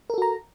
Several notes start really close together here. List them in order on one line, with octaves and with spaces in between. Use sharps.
A#4 A4 F#4 A#5